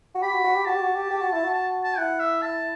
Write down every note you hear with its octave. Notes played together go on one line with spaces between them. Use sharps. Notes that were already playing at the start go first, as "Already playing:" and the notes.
F#4
G4 B5
F#4
F#4
G4
F#4 A5
G4
F#4
G4
G4
F#4
E4
F#4
A5
A5
E4 F#5
E5
A5